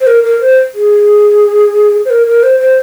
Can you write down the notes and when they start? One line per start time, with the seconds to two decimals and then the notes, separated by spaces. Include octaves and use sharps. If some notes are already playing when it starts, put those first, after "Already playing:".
0.01 C5
0.07 A#4
0.24 A#4
0.41 C5
0.75 G#4
2.05 C5
2.10 A#4
2.27 A#4
2.43 C5
2.60 C5